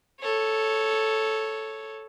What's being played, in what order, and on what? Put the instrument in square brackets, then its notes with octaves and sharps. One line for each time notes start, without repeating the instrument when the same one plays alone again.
[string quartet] A4 C#5